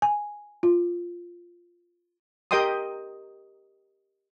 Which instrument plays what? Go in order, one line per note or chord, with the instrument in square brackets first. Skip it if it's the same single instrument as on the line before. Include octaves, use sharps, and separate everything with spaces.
[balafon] G#5
F4
[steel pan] G4 A#4 D#5 G5 C6 D#6